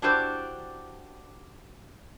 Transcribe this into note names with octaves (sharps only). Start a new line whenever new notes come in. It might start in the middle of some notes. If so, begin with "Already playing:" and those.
D4 E4 F#4 G4 C5 D5